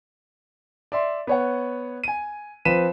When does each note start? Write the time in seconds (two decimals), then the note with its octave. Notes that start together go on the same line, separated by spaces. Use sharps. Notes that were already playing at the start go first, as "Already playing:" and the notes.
0.92 D5 E5 C6
1.27 B3 C#5 F#5
2.04 G#5 D#7
2.65 F3 C4 B4 B6 D#7 E7